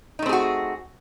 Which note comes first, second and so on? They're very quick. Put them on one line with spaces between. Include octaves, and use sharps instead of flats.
D#4 A3 C4 G#4 F#4